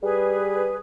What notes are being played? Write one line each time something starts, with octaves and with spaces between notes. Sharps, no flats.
G3 G#4 B4